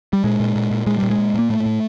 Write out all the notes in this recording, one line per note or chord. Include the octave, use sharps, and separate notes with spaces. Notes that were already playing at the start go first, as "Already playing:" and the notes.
G3
A#2 G#3
A#2
A#2
A#2
A#2 G#3
A#2 G3
G#3
A#2
A#2 A#3
A2 A3
A2